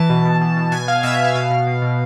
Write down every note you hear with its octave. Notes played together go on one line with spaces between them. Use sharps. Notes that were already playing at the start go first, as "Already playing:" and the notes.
Already playing: E3 A5
B2
B2
B2
B2
B2 G#5
B2 F5
B2 E5
E5
B2
F5
B2 F5
B2
B2
B2